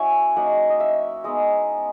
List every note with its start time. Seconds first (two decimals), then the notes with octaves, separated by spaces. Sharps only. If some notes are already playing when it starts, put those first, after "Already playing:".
Already playing: F#3 C#4 E4 C#5 E5 F#5 G#5
0.36 F#3 A#3 D#4 F#5
0.70 D#5
0.80 E5
1.24 G#3 B3 D#4 D#5